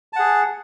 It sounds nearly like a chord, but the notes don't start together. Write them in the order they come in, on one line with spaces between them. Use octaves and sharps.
A5 F#5 G#4